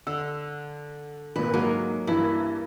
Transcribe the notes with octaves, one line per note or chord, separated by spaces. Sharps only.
D3 E6
G#1 A#2 B4
G#2 F#3 A#3 G#5
G2 E3 A#3 E4